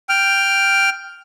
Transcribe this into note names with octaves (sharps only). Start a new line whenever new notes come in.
G5 F6